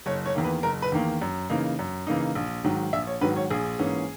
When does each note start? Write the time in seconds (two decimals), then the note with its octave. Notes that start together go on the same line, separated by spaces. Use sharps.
0.06 F#1 C#5
0.26 C#5
0.35 E2 D#3 A#3
0.44 B4
0.63 F#1 A#4
0.82 B4
0.92 E2 D#3 A#3
1.22 F#2
1.50 C#3 E3 A#3 D#4
1.79 F#2
2.07 C#3 E3 A#3 D#4
2.35 A#1
2.64 G#2 D#3 F#3
2.93 A#1 E5
3.07 C#5
3.21 G#2 D#3 F#3 B4
3.36 C#5
3.50 A#1 G#4
3.79 G#2 E3 A#3 C#4